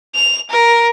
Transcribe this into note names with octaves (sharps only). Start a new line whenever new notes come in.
F7
A#4